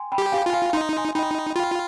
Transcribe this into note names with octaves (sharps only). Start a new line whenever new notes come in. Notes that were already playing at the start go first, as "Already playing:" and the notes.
Already playing: G5 G#5 C6
G5 B5
G4
F5 G#5
F4
F5 G#5
D#4 C6
G#5 C6
D#4 G5 B5
F4 G5 B5